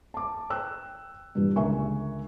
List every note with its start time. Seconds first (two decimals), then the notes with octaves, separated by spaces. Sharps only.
0.14 A5 D6
0.50 G5 E6 F#6
1.35 G2 A#2 E3 G3
1.56 C#2 D3 A#4 E5 G#5 C#6